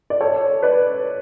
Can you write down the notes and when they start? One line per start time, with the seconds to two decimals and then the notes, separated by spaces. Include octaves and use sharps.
0.10 D5
0.20 A4 C#5
0.62 B4 D5